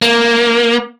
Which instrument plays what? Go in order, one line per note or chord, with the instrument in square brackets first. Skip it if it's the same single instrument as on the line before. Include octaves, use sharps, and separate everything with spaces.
[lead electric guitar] A#3